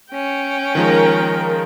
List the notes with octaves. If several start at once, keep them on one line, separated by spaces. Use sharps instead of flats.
C#4 G5
D#3 F3 G#3 A#4